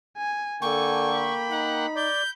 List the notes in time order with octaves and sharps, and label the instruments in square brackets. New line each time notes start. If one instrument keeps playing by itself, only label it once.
[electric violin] G#5
[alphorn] D3 [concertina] A#3 G5 [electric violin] A4 G#5 [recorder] C#6
[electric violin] B5
[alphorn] D#4 [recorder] F#5
[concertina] D5 [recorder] G6